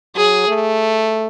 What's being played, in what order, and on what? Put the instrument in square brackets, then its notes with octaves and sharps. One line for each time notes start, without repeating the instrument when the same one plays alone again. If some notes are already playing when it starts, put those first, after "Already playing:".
[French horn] F#3 [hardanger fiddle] G#4
[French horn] A3